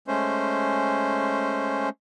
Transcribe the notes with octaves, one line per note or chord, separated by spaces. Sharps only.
G#3 A3 C#4 C5